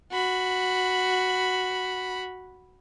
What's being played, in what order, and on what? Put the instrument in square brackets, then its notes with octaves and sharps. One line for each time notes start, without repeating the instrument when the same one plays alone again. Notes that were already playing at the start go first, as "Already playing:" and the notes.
[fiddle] F#4 B5